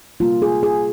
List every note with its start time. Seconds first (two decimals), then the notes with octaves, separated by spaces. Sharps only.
0.20 C3 G3 A#3 F4
0.42 G#4
0.63 G#4